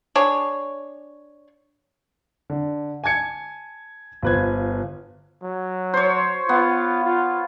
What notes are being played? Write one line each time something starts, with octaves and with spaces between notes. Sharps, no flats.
D4 G#4 C#5
D3
G#5 A5 G#6 C#7
G1 F4 B4 C5 G#6
F#3
C5 C#5
B3 F4
F4